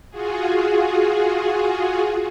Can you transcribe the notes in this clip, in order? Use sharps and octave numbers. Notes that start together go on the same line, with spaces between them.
F4 F#4 G#4